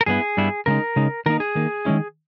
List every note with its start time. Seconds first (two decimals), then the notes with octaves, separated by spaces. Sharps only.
0.01 A#4
0.06 G2 G3 B3 E4 G#4
0.37 G2 G3 B3 E4
0.66 C#3 G#3 D#4 A#4
0.96 C#3 G#3 D#4
1.26 D#3 A#3 D#4 A#4
1.40 G#4
1.55 D#3 A#3 D#4
1.85 D#3 G#3 C#4 E4